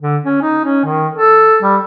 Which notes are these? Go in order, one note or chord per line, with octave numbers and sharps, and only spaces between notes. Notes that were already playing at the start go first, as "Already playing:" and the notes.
D3
C#4
D#4
C#4
D#3
A4
G3